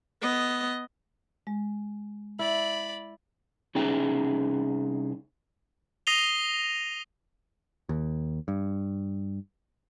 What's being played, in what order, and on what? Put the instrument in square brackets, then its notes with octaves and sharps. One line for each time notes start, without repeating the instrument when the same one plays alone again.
[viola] B3 D#5
[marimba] G#3
[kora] E4 [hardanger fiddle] D5 B5
[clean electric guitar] C2 C#4 D#4 G#4 E5 G5
[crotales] D#6 A#6 C7 D#7 F7 G7
[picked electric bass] D#2
G2